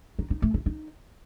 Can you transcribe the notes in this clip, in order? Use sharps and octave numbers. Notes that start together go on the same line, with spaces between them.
D#4
D#4
A3
E4
D#4